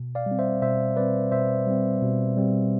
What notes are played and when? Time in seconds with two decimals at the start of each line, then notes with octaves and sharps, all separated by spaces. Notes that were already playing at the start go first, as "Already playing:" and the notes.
Already playing: B2
0.15 D5 F5
0.26 G3
0.31 C4
0.39 C5 E5
0.62 B2 C5 E5
0.97 G3 C4 B4 D5
1.32 B2 C5 E5
1.67 G3 C4
2.02 B2
2.37 G3 C4